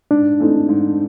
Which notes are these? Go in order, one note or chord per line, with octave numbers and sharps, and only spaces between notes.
G#2 D4
E3 A3 C4 D#4
G#2